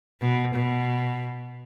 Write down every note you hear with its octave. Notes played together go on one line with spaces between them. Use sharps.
B2
B2